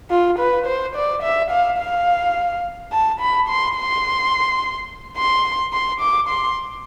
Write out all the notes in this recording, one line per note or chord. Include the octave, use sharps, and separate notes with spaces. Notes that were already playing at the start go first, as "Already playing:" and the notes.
F4
B4
C5
D5
E5
F5
F5
A5
B5
C6
C6
C6
C6
D6
C6